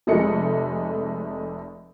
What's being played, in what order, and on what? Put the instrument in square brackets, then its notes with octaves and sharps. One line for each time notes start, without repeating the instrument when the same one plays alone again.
[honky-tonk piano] F1 C3 G#3 A3 D#5 C#7